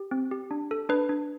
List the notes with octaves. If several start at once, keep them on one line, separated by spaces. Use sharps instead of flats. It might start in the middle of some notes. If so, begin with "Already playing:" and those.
Already playing: G4
C4
G4
D4
A4
D4 B4
D4